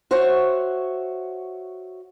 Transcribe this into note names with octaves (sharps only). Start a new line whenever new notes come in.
F#4 C5 C#5 E5 F#5 G#5